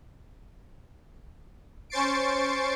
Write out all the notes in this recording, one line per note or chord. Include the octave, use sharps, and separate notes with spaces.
C#4 C5 C#6 A6 C7 D7